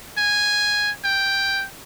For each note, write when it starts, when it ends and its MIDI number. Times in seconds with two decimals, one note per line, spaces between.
0.18 0.90 80
1.05 1.65 79